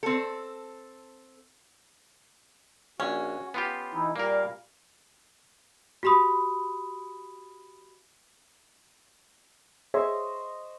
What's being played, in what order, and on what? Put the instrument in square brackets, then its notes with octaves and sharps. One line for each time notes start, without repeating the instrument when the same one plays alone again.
[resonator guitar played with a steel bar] C4 A4
[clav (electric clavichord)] A#1 [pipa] C#4 [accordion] F#4
[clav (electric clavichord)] B3 F4 G4 [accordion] C6
[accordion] E3 D#4 E4
[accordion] A#2 G3 F5 [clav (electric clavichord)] A#3 A#4
[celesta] F#4 G4 B5 C6 D#6
[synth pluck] G#4 C#5 E5 [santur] C5 D#5 C#6